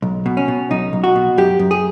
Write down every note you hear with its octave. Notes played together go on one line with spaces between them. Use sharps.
B1
B2
C#4
B2
B1 D#4
B1
F#4
B2
F#2 G4
F#2
G#4